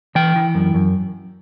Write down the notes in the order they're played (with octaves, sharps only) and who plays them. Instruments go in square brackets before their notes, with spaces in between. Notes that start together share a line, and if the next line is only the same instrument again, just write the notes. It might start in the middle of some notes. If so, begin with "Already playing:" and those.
[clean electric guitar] E3 G5
E3
F#2
F#2